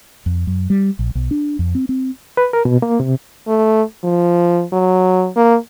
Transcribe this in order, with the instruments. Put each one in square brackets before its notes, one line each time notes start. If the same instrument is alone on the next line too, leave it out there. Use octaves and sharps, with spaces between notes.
[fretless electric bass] F2
F#2
G3
A#1
B1
D4
F2
C4
C4
[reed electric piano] B4
A#4
B2
A#3
C3
[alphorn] A3
F3
F#3
A#3